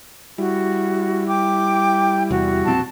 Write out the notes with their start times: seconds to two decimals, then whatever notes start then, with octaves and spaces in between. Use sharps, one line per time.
0.38 G3 E4 F#4
1.28 G5 D6
2.30 E2 C3 F#4
2.65 E1 A#1 C4 A5